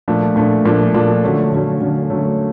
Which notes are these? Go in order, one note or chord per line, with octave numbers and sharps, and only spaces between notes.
A#2 F3 A3 D4
A#2 F3 A3 D4
A#2 F3 A3 D4
A#2 F3 A3 D4
D3 F#3 A3 C#4
D3 F#3 A3 C#4
D3 F#3 A3 C#4
D3 F#3 A3 C#4